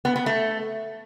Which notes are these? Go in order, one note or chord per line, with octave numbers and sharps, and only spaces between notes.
B3
B3
A3